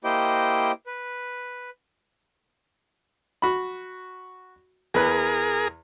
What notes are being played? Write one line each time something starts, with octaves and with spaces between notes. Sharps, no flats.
A#3 E4 G4 C5 D#5 G5
B4
F#4 B5
E2 G#4 A#4 B4 F#6